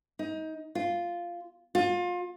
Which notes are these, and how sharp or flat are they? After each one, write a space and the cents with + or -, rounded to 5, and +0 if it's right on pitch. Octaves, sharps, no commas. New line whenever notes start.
D#4 +25
F4 -5
F4 +30